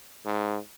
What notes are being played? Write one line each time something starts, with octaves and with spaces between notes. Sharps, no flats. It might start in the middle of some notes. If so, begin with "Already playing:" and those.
G#2